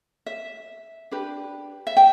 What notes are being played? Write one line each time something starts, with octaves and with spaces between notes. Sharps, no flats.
E5
D4 G4 B4
E5
G5